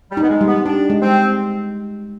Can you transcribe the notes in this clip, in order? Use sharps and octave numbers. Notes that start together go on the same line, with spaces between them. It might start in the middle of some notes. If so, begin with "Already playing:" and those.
G3
D#4
B3
G#3
G3
B3
D4 G4
G#3
C4